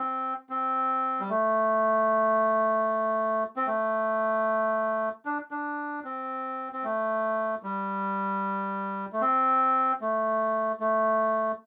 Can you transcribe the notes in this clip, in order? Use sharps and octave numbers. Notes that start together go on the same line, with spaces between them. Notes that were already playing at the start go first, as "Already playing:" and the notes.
Already playing: C4
C4
G3
A3
C4
A3
D4
D4
C4
C4
A3
G3
A3
C4
A3
A3